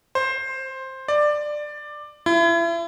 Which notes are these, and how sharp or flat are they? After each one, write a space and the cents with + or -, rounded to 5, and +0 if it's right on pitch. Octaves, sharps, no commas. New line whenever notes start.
C5 +10
D5 +15
E4 +35